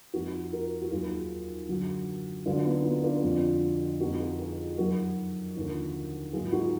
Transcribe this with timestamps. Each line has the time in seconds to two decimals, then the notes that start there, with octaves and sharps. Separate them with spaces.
0.13 F2 F3 D#4 F#4
0.52 F#4 A#4
0.82 F#4
0.91 D#2 D#3 F#3 F4 G#4
1.68 F#2 D3 F#3
2.46 D2 D3 F#3 D4 F4
2.65 B3 D#4
2.84 B3 D#4
3.04 D4 F4
3.23 F2 D3 F3
4.00 F2 F3 D#4 F#4
4.20 F4 G#4
4.39 F4 G#4
4.78 F#2 D#3 F#3 F#4 A#4
5.55 D#2 D3 F3
6.33 G#2 D#3 F#3 F4 G#4
6.52 D#4 F#4